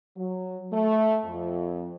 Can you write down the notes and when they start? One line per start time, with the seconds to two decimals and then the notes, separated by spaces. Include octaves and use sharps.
0.16 F#3
0.72 A3
1.24 F2